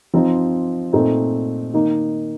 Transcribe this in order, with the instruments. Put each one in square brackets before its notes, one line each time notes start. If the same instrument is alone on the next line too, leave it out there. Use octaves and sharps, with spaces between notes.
[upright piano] F3 C4 D#4
A#2 A3 C4 D#4
D#3 A#3 D#4